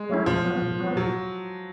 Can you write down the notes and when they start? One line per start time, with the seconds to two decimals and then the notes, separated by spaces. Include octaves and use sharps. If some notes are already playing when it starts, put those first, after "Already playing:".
Already playing: G#3
0.10 F#3 A3 C#4 E4
0.26 A#2 F3
0.45 F#3 B3
0.62 A#2
0.79 F#3 B3
0.96 A#2 F#3